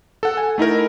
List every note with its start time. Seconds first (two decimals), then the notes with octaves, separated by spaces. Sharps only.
0.23 A4 F#5
0.37 G#5
0.58 A3 D#4 E4 A#4